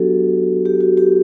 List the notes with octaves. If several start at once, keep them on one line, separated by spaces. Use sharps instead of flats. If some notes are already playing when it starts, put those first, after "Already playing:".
Already playing: F#3 B3 D4 F#4 G4 A4
G4
F#4
G4